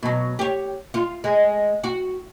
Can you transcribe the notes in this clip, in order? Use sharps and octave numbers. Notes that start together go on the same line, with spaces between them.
B2 F#3
G4 C#5
F4
G#3
F#4